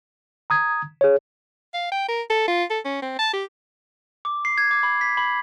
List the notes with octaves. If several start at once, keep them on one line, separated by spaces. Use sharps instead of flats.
A#5 D#6 G#6
G#4 C#5
F5
G5
A#4
A4
F4
A4
C#4
C4
A5
G4
D6
C7
G#6
D6
B5
B6
B5